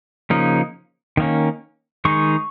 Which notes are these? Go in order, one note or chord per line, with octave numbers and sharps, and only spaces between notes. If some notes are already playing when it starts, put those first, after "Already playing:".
C#3 F3 A#3 D#4
D#3 A#3 C#4
D#3 G#3 D#4 C#6